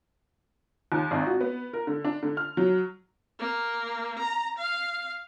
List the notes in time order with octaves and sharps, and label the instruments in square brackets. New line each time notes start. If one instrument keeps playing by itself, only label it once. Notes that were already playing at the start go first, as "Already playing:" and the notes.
[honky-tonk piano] D#2
G#1
F#4
B3
A#4
D3
D4
D3
F6
F#3
[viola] A#3
A#5
F5